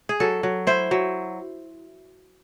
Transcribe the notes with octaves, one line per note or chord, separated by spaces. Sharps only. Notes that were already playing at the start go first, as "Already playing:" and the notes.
G#4
F#3 A4
F#3
E4 C5
F#3